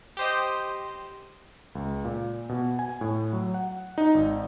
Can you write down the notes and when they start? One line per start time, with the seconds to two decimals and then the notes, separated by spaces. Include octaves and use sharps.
0.17 G4 C5 D#5
1.75 C#2
2.05 A#2
2.49 B2
2.79 G#5
3.01 A2
3.33 F#3
3.54 F#5
3.98 D#4
4.14 G#1